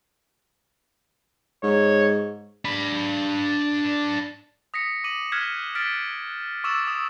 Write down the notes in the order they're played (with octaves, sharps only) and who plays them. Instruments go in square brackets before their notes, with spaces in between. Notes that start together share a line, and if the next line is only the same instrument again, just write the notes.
[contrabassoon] G#2 [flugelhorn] C#5
[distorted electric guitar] D4 B5
[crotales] D#6 A#6 B6 C#7
D6 D#7 F#7
F6 F#6 G#6 B6 C#7 E7
F6 A6 B6 D7
C#6 D6 E6 A6 E7
D#6